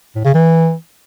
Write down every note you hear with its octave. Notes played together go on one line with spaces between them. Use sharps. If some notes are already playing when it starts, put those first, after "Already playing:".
A2
C#3
E3